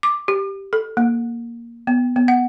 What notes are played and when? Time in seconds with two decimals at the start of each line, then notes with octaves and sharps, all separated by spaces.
0.03 D6
0.28 G4
0.73 A4
0.97 A#3
1.87 B3
2.16 B3
2.28 F#5